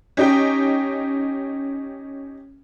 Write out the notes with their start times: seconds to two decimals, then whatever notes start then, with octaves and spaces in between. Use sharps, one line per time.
0.17 C#4 D#4 G4 G5